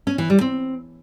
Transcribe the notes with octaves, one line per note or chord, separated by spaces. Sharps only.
C#4
E3
G3
C4